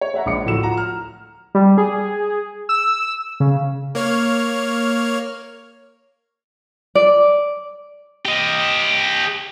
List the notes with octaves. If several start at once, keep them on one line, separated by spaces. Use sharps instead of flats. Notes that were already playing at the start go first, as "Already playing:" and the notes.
C#5
C#5 E5 F#5 A#5
A#1 G#3 D6 C#7
D1 A2 F3 F#4 E6 E7
F4 F#5 A#5
F6
G3
G#4
E6
C#3
A#3 C#5 F6
D5
G4 D#5